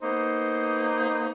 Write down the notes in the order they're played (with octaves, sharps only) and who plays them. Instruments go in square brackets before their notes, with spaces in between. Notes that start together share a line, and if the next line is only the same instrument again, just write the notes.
[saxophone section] A#3 B3 D#4 C5